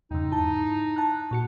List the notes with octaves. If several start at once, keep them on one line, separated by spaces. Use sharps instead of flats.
E2 G2 C#3 D#4
G#2 E4 A5
A5 F#6
A#2 F#4 C#7